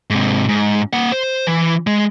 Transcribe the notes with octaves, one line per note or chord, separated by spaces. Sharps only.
G#2 C3
G#2
A#3 F#5
C5
E3
G#3